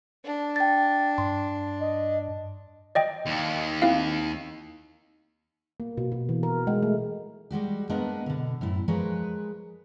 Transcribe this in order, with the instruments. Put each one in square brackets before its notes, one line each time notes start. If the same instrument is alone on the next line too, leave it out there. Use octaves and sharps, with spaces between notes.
[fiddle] D4
[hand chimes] G5 A6
[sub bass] G2 [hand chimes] C6
[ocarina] D#5
[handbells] D5 D#5 G5
[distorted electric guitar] D#2
[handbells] C4 E4 F5
[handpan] A#3
B2
B2
E3
A#4
G#3
A3
[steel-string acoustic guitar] G3 G#3 F#4 G4
G#3 A#3 B3 D4 A#4 D#5
B2 D3
F#2 A2 E4
F3 G#3 G#4 A#4 B4 C#5